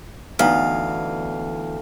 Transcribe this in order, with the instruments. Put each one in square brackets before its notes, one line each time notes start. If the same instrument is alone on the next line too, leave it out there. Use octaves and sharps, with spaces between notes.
[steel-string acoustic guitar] D2 [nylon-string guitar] E3 B3 D#4 [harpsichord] F5